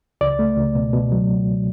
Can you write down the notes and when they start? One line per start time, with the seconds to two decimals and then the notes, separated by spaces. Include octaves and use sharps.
0.21 C#2 D5
0.39 A3
0.57 C#2
0.75 B2
0.93 B2
1.12 F#3